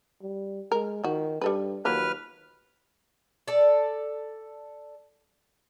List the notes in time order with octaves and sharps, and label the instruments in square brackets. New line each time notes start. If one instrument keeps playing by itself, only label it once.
[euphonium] G3
[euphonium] G#3 [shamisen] A#4
[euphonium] D#3 [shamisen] F3 F#4
[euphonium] G2 [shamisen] G3 A4 B4
[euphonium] D#2 [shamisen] F3 F#3 A#3 [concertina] B4 F6
[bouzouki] A4 D5